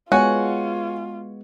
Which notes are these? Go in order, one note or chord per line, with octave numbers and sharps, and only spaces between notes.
G#3 B3 F4 F#4 C#5 G#5